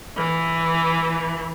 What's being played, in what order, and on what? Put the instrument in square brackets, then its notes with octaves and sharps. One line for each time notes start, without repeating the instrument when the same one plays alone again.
[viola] E3